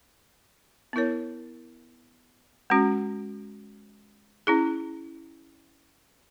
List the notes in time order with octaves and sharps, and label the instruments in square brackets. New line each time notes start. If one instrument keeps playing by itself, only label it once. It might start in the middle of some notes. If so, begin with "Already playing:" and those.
[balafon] B3 E4 A#4 C#5
G#3 C#4 F#4
C#4 E4 G#4